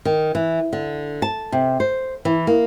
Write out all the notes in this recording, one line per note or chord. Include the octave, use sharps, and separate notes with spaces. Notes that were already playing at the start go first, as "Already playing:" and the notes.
D#3
E3
D3
A5
C3
C5
E3
A#3